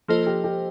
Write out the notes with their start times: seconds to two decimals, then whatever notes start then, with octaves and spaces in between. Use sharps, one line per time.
0.08 F3 A#3 F4 A4 C5 D#5
0.27 G4
0.44 G4